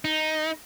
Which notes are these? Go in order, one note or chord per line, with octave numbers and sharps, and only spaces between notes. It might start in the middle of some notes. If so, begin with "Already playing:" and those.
D#4